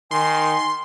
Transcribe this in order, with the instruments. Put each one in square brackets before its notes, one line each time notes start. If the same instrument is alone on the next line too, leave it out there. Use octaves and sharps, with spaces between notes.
[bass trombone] D#3 [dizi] G#5 [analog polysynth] C6